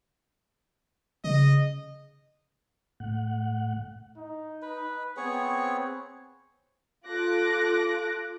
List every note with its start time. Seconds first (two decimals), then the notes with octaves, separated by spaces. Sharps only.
1.24 C#3 D#5
3.00 A2 F#5
4.17 D#4
4.62 B4
5.17 B3 C4 G#4 C#5
7.05 F4 A4 D6 F#6 A#6